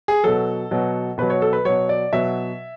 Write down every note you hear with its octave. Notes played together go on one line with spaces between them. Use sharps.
G#4
B2 F#3 A4
B2 F#3
B2 F#3 B4
C#5
A4
B4
B2 F#3 C#5
D5
B2 F#3 E5